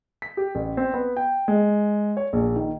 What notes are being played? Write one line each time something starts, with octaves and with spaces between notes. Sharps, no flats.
B6
G4
A1
C4
B3
G5
G#3
C#5
A#1
D#3